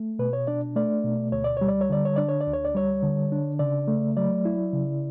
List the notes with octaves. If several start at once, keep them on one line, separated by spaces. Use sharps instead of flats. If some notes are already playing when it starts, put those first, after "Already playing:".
Already playing: A3
B2 B4
C#5
D4 D5
A3 D5
B2
D2 C#5
D5
G3 C#5
D5
C#5
D3 D5
C#5
D4 D5
C#5
D5
D2
C#5
D5
G3 C#5
D3
D4
C#3 D5
A3
F#3 D5
E4
C#3